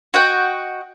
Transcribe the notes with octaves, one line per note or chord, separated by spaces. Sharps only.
F#4 D#5 F#5 G5